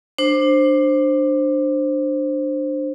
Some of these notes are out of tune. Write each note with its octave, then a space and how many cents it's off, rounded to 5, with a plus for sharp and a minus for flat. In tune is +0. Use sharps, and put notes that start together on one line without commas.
D4 +15 C5 +10